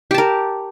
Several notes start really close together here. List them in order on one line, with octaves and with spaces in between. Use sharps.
G4 A5 A#4